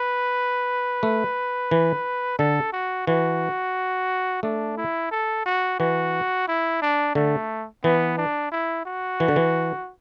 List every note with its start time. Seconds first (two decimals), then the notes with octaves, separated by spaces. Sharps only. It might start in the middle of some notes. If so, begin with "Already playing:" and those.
Already playing: B4
1.03 A3
1.71 E3
2.39 D3 A4
2.73 F#4
3.07 E3 F#4
4.43 A3 D4
4.78 E4
5.11 A4
5.46 F#4
5.80 E3 F#4
6.48 E4
6.82 D4
7.15 D3 A3
7.84 E3 B3
8.18 D4
8.51 E4
8.85 F#4
9.20 E3
9.28 D3
9.36 E3